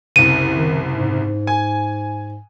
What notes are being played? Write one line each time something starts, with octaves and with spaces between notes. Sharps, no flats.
F#1 C2 D#7
D#3
G#2
G#5